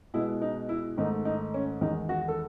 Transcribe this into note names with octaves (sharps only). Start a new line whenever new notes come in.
B2 G#3 B3 E4
D#4
E4
G#2 D#3 A3 D#4
D#4
C#4
E2 D#3 G#3 D#4
F#4
A4